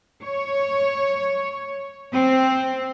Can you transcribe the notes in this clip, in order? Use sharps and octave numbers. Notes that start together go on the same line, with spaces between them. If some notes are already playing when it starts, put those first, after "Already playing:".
C#5
C4